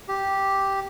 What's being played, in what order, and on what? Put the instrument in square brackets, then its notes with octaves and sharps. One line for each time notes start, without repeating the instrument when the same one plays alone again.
[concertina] G4